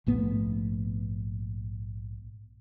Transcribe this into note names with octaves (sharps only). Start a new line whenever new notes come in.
A#1 G#2 A3 B3